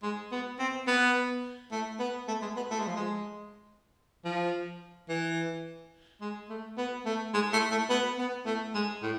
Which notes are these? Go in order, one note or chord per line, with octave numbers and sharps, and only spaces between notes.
G#3
B3
C4
B3
A3
B3
A3
G#3
B3
A3
G#3
F3
G#3
F3
E3
G#3
A3
B3
A3
G#3
A3
A3
B3
B3
A3
G#3
A2